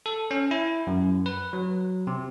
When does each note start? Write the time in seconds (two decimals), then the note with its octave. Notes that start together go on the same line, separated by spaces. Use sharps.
0.06 A4
0.31 C#4
0.51 E4
0.87 F#2
1.26 B4
1.53 F#3
2.07 C3